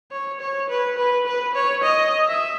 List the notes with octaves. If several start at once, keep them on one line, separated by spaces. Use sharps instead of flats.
C#5
C#5
B4
B4
B4
C#5
D#5
E5